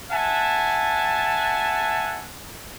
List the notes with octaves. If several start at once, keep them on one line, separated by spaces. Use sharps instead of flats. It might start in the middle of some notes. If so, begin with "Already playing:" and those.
E5 F#5 G#5 A5